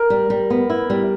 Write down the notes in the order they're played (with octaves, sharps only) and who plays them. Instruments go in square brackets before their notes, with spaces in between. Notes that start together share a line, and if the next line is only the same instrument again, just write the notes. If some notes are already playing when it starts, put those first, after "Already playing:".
Already playing: [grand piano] A#4
[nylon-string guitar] G3
G3
B3
E4
G3